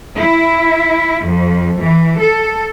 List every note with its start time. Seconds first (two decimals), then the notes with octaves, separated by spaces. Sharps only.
0.17 E4
1.26 F2
1.82 E3
2.20 A4